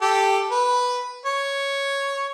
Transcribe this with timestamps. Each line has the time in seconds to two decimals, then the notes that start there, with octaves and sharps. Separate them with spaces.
0.02 G4 A4
0.51 B4
1.26 C#5